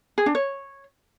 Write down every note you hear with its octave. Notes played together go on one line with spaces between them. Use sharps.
G#4
D4
C#5